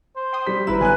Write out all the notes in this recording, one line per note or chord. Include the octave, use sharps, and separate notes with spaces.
C5
G5 C6 D#6
G3 B6
G#1 G#2 E4 A#4 B4 E7
D3 F#3 B3 G#5 F#6